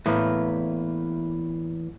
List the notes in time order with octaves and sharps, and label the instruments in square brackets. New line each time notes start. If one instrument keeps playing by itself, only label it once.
[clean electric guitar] E2 B4 [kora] A2 A#3